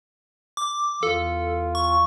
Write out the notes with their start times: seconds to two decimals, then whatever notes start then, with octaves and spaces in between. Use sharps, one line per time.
0.57 D6
1.03 E2 F4 A4
1.75 C#6